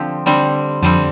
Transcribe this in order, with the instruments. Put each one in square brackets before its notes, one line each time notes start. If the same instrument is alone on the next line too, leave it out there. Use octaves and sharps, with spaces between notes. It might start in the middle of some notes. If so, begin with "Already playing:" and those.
Already playing: [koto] D3 F3 C4 G4
D3 G3 C4
[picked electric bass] F2 [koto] D3 G3 C4